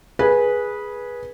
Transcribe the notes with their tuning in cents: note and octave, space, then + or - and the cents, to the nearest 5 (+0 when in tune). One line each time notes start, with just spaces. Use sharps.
G#4 +0 B4 -15